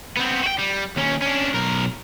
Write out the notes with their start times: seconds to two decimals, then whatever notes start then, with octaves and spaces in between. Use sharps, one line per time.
0.17 B3 C4
0.43 F#4 G5
0.58 G3
0.96 D#2 C#4
1.22 C#4 D4
1.54 B1 A#4